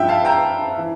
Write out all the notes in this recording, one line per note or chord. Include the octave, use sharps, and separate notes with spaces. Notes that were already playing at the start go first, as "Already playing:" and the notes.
Already playing: G2 F3 E5 G5
F5 A5
G5 A#5
E3